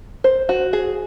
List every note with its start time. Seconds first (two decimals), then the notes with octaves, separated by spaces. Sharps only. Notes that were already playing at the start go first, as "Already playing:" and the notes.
0.24 C5
0.49 F#4
0.73 G#4